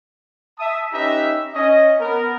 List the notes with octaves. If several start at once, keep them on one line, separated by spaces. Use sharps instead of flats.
E5 A5 D#6
C#4 D#4 G4 B4 E5 A#5
C#4 D#5
B3 A#4